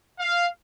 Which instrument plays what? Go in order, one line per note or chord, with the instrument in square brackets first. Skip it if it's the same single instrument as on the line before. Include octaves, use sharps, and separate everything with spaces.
[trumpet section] F5